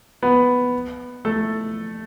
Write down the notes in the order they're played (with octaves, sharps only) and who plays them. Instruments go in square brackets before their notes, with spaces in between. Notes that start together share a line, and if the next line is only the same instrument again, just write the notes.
[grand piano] B3 B4
A3 A4